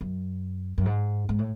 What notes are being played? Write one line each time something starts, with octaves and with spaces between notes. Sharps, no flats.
F#2
F#2
G#2
G#2
A2